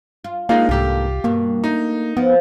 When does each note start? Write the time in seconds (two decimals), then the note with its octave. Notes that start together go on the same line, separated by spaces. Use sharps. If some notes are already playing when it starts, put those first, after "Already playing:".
0.24 F4
0.49 G#3 A#3 D4 D#4 F4
0.69 C2 G#2 A#3 F4 G4 A4
1.24 G2 B2 A#3
1.64 A3 D#4
2.17 F3 B3